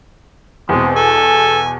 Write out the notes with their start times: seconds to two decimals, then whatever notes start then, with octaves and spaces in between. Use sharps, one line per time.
0.69 E2 B2 G#3 C4
0.96 A4 G#5